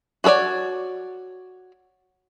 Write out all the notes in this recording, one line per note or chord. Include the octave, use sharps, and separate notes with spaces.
F#4 G#4 A4 C#5 D5